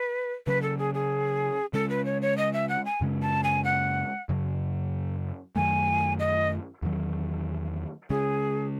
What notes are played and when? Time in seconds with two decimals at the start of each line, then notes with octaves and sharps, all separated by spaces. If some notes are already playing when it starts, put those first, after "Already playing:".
Already playing: B4
0.47 C#3 F#3 C#4 B4
0.62 A4
0.78 G#4
0.94 G#4
1.73 C#3 G#3 C#4 A4
1.90 B4
2.05 C#5
2.22 C#5
2.37 D#5
2.53 E5
2.69 F#5
2.85 G#5
3.01 F#2 C#3 G#3 C#4
3.22 A5
3.44 G#5
3.64 F#5
4.29 F#2 C#3 F#3
5.56 F#2 D#3 F#3 A3 G#5
6.19 D#5
6.82 E2 D#3 F#3
8.10 C#3 G#3 C#4 G#4